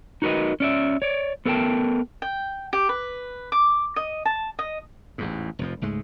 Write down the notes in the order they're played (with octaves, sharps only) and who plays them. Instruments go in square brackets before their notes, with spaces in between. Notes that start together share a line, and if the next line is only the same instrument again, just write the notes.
[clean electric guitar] D#4 F#4 A#4 B4 D#5
C#4 D5 E5
C#5 D5
B3 A4 A#4 C5 G5 A5
[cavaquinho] G5
G4
B4
D6
D#5
A5
D#5
[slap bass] A1 E2 G#2
F1 F2 F3
C#2 G#2 G#3 A3